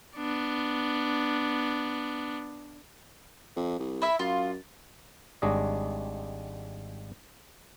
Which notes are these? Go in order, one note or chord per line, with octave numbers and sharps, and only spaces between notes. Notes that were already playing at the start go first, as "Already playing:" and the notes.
B3 D4
F2
C2
E4 E5
F#2 F4
G#1 G3 G#3 D4 C#5 D#5